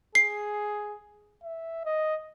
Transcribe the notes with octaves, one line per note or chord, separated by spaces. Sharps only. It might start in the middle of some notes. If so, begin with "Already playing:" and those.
G#4 C7
E5
D#5